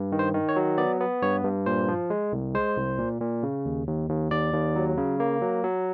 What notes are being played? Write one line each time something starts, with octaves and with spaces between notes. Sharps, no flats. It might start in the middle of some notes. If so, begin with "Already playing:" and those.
Already playing: G2
D#3
C5
D#3
C#5
F#3
B3 D5
B3
G2 C#5
G2
A#2 C5
F3
G#3
C2
G#3 C5
C2
A#2
A#2
C#3
D#2
D#2
D#2
D#2 D5
D#2
F#3
C#3
A#3
F#3
F#3